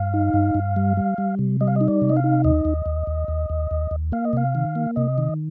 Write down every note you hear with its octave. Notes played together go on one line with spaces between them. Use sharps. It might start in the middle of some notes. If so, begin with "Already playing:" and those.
Already playing: G2 F5
D#4
G2
G2
G3
G3
G3
C3
G3 D#5
F5
D#4 D#5
D5
C3
D#5
F5
D#4
D#2 D#5
D#2
D#2
D#2
D#2
D#2
D#2
D#2
A#3 F5
D#5
C3 F5
D#3
A#3
C3 D#5
D#3